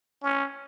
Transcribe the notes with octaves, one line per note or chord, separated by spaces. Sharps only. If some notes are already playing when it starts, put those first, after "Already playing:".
C#4